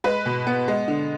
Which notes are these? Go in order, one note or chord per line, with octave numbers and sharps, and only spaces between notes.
G#3 B4
B2
B3
G#3
D3